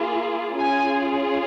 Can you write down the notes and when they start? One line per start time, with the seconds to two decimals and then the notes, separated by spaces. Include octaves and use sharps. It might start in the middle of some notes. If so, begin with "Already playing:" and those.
Already playing: A#3 F4 G#4
0.61 C#4 F4 G#4 G#5